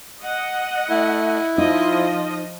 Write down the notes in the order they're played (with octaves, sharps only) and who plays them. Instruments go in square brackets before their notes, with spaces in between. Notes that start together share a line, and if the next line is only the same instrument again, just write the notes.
[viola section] D#5 F#5
[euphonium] A3 [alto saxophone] E4
[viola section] F3 D#5 [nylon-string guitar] D#4 [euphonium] F4